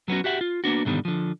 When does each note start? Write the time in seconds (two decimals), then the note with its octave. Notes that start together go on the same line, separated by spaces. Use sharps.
0.08 F#3 B3 C#4 F#4
0.24 F#4 G4 E5 F#5
0.41 F4
0.64 A#3 B3 D4 F#4
0.85 C2 G#2 D3 D#3 G3 B3
1.05 D3 F3